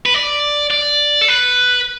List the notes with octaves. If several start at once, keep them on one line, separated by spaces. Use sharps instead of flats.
B4
D5
D5
A4
B4